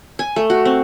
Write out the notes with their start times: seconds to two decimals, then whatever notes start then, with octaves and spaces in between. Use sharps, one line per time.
0.19 G#5
0.36 A3
0.50 F#4
0.65 C4